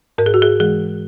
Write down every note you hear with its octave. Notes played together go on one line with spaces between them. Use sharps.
G#2 A#4
G#4
F#4
G#4
E3 G#3 G#4